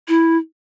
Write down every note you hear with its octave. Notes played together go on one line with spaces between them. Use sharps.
E4